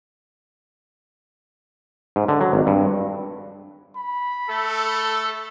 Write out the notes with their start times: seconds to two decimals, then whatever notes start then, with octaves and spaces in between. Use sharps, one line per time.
2.16 G#2
2.28 D3
2.41 F#3
2.53 G#1
2.67 G2
3.96 B5
4.49 A3 A4